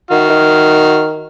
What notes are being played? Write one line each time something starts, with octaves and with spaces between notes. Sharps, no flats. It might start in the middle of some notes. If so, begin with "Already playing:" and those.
D#3 F#4 F6
D#3